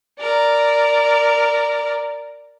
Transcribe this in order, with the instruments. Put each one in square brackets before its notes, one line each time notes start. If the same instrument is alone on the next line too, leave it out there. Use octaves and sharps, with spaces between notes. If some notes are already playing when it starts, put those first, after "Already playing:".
[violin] A#4 D5